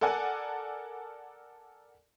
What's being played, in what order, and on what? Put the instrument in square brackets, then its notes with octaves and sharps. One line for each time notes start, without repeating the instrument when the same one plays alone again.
[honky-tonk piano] A4 A#4 D5 F#5 G#5